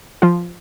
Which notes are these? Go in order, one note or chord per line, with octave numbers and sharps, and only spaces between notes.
F3 F4